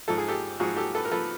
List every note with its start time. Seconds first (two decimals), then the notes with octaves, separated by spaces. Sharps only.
0.08 G#2 F3 A4
0.18 G#4
0.28 G4 A4
0.59 G#2 F3 F#4 G#4
0.77 G4 A4
0.95 A4 B4
1.05 A#4
1.12 F3 A4 B4